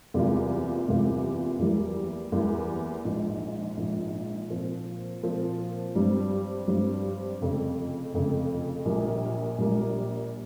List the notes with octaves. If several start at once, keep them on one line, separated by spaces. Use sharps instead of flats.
E2 C3 G3 A#3 F4
E2 C3 G3 A#3 F4
E2 E3 G3 A#3
E2 E3 G3 A#3
A#1 G#2 F3
A#1 G#2 F3
A#2 F3 C4
A#2 F3 C4
G2 G3 C4
G2 G3 C4
F1 F2 C#3
F1 F2 C#3
A#1 A#2 G3 A#3
A#1 A#2 G3 A#3